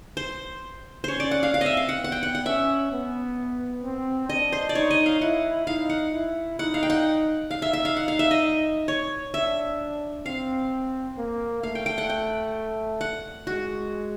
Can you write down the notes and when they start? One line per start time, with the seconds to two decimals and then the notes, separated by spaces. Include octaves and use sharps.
0.17 C5
1.04 C#4 C5 C#5
1.20 D5
1.31 F#5
1.43 F5
1.54 C4 F5
1.61 D#5 E5
1.77 F5
1.89 F#5
2.01 B3 F#5
2.12 G5
2.23 F#5
2.35 F#5
2.46 C#4 E5
2.92 B3
3.83 C4
4.29 D4 D#5
4.52 C5
4.69 D5
4.75 D#4 C#5
4.91 D#5
5.06 F5
5.21 E4 F#5
5.67 D#4 F5
5.90 F#5
6.13 E4
6.59 D#4 F#5
6.74 F5
6.83 G5
6.90 F#5
7.50 D#4 F5
7.62 E5
7.73 E5
7.85 F5
7.97 F#5
8.08 F5
8.19 E5
8.31 D#5
8.88 C#5
9.34 D4 E5
10.25 C4 F5
11.18 A#3
11.63 A3 F5
11.75 G5
11.86 G5
11.98 F#5
12.10 G5
13.01 F#5
13.47 G#3 F#4